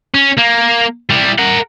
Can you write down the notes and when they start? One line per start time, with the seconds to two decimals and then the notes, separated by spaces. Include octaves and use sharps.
0.15 C#4
0.38 A#3
1.10 G3 E4
1.39 A#4 F#5